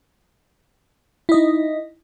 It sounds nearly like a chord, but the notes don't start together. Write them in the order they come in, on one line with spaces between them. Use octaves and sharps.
E4 D#5 D#4